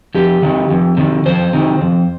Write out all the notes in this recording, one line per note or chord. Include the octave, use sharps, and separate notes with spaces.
F2 G4
C3 D#3
F2
C3 D#3
F2 C5
C3 D#3
F2